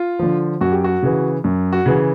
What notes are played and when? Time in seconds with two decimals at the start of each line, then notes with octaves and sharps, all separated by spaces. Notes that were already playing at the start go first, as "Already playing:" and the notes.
Already playing: F4
0.19 D3 F3
0.61 F#2 F#4
0.72 G4
0.84 F#4
1.03 C#3 E3
1.44 F#2
1.73 F#4
1.86 C#3 E3